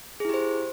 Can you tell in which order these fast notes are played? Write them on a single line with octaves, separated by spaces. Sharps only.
G#4 E4 G4 C5